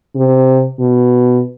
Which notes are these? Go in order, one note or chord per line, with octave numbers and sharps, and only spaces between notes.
C3
B2